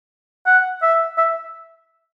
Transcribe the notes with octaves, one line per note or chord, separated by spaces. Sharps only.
F#5
E5
E5